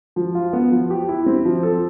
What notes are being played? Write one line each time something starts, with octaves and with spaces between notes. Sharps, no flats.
F3
F4
B3
F3
G4
E4
C4
F3
A4